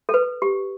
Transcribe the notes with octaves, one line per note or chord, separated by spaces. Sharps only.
A4
B4
G4